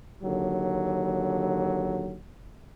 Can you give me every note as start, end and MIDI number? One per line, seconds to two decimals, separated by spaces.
0.23 2.18 39
0.23 2.18 50
0.23 2.18 54